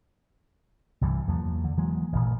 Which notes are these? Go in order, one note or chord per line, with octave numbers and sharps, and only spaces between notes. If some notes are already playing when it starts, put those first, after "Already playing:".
C2 G2 E3 G3
E2 F3 F#3 A#3
D3
E3 F#3 G#3 A#3
A1 A#2